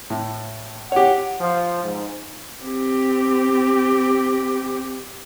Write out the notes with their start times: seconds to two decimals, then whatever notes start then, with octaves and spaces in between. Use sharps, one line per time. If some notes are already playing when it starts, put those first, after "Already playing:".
0.10 A2
0.92 G4 C#5 F#5
1.40 F3
1.83 G#2
2.62 C4 G4